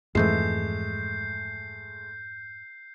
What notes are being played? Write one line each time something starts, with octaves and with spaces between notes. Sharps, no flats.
F2 G#2 E3 G#3 A3 G6 C7